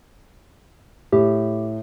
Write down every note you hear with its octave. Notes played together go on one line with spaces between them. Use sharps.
A2 G4